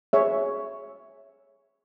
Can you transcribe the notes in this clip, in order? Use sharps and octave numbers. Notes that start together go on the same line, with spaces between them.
G#4 C#5 E5